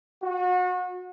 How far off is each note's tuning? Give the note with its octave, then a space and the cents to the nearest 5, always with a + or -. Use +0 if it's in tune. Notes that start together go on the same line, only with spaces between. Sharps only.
F#4 -30